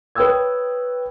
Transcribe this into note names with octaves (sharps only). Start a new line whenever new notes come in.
B4 C#5 G5 D#6 E6 G#6